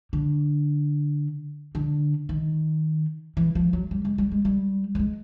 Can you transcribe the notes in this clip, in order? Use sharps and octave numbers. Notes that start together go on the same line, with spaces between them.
D3
D3
D#3
E3
F3
F#3
G3
G#3
G3
G#3
G3
G3
G#3